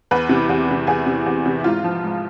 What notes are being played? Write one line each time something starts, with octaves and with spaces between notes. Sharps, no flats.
E2 B4
C3 E3
E2
C3 E3
E2 G#4
C3 E3
E2
C3 E3
E4
G#2 F4
F3
G#2